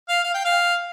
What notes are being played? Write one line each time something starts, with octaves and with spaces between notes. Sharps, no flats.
F5
F5
G5
F5